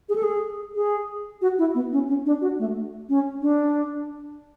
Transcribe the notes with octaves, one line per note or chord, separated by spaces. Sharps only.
G#4
A4
G#4
G#4
F#4
E4
B3
C#4
C#4
D4
F#4
A3
C#4
D4